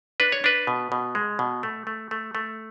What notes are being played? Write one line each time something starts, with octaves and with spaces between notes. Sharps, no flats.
D4 B4
C#5
D4 B4
B2
B2
G#3
B2
A3
A3
A3
A3